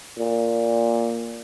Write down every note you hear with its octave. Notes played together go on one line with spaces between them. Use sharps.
A#2